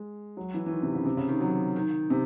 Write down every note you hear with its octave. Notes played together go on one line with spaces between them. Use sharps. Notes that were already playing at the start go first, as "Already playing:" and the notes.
Already playing: G#3
F#3
E3
E3
D#3
C3
C#3
C3
C#3
D#3
F#3
D#3
C3